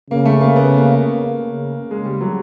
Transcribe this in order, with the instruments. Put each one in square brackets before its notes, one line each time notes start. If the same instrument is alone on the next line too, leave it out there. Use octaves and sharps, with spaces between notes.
[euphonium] C#3 [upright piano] A#3
[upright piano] A3
A#3
B3
A#3
[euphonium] C#3
[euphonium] C#3 [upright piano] G#3
[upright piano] G3
F#3